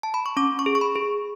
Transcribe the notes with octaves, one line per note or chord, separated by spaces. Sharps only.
A5
B5
C#6
C#4 D6
C#6
G#4
C#6
B5
G#4